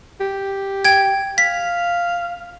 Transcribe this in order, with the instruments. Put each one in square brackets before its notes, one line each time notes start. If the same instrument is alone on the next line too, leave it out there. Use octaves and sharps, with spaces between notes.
[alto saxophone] G4
[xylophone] G5 G#6
[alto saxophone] F5 [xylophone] B6